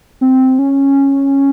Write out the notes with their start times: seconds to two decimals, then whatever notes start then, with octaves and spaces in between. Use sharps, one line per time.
0.21 C4
0.59 C#4